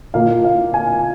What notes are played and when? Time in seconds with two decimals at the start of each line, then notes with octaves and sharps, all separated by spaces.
0.14 A#2 A#3 F5
0.44 F5
0.74 G#5